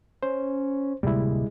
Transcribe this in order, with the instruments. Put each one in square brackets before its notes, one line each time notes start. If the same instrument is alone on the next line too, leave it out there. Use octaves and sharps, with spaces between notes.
[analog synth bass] C#4 [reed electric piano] C5
[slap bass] D1 C3 A#3 [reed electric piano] G3 E4 [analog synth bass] G#3